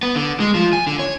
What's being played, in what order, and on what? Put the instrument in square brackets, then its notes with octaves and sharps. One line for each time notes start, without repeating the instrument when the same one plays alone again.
[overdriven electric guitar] B3
D3
G#3
F3
G#5
D3
C#5